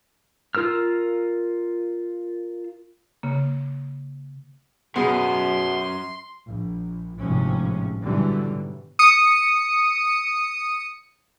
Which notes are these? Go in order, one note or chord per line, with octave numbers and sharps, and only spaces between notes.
F4 A#4 E6 F6
C#3 A#3
F#2 B2 B3 G#4 C6
A#1
G#1 A2 C3 F3 C#4
G#2 B2 D3 E3 F#3 G3
D#6 C#7